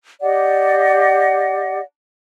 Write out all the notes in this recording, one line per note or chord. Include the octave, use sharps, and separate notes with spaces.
G4 D5 D#5 F#5